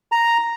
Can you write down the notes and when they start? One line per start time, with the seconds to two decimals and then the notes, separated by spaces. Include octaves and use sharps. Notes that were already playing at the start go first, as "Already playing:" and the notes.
0.12 A#5